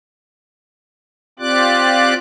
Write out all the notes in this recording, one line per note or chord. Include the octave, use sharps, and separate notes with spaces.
C4 F4 G4 D5 D6 F#6